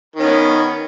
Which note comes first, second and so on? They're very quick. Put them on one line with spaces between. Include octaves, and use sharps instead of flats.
D#3 C#4 B3